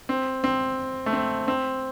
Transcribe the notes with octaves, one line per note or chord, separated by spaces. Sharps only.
C4
C4
A3
C4
C4